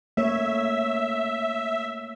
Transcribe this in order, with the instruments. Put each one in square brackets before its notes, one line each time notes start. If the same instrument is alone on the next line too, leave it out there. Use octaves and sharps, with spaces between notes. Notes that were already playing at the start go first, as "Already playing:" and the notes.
[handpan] A3 A#3 C#5 [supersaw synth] E5